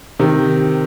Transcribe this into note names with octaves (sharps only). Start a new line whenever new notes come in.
C3 D#3